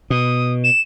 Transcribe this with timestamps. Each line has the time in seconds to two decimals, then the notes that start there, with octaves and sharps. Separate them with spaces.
0.10 B2 D#6
0.64 E7